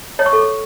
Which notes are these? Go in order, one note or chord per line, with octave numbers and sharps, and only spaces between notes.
C#5
C#6
A4